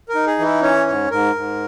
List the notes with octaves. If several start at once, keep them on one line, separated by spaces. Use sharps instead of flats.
A#4
D#4
G#4
E3
E4
C#4 C#5
G#2 C#5
G#2 A#4
G#2